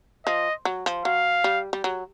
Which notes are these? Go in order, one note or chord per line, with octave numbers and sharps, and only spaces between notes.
F3 D#5
F#3
F3
F#3 F5
G3
G3
F#3